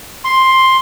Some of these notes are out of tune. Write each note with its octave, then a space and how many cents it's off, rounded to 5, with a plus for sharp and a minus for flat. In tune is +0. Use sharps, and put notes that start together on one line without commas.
C6 +5